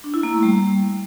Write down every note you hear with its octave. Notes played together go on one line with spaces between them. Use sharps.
D4
E4
A#3
A3
G3